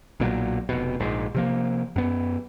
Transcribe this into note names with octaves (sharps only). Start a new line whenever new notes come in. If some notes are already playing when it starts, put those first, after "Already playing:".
B1 A#2 F3 F#3
F1 B2
A#1 G#2
C3 F3 A#3
F#2 B3